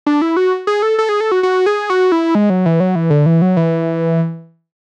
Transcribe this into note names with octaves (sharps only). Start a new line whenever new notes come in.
D4
E4
F#4
G#4
A4
A4
G#4
A4
F#4
F#4
G#4
F#4
E4
G#3
F#3
E3
F#3
E3
D3
E3
F#3
E3